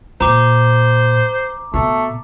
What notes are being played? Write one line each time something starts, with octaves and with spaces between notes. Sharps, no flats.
A#2 C5 A#5 D6
B2 A3